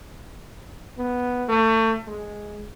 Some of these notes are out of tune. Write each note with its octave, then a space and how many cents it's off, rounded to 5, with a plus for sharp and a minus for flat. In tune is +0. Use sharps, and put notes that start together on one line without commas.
B3 +0
A3 +30
G#3 +0